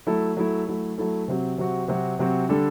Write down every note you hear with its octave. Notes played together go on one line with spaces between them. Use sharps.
F#3 A3 E4 A4
F#3 A3 E4 A4
F#3 A3 E4 A4
F#3 A3 E4 A4
C3 F#3 C4 F#4
C3 F#3 C4 F#4
C3 F#3 C4 F#4
C3 F#3 C4 F#4
D3 G3 D4 A4